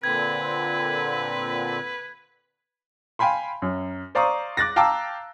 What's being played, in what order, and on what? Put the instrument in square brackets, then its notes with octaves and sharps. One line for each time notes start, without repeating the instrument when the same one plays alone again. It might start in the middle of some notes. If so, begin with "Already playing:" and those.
[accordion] A#2 D3 C4 [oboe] B4 [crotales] G#6
[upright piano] F5 G5 G#5 B5 C6
F#2
C5 D5 F5 A#5 C#6 D#6
D6 F#6 A6 A#6
F5 G5 A5 A#5 D6 E6